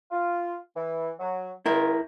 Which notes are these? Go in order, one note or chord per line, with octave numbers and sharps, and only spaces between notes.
F4
E3
F#3
C#2 E4 A#4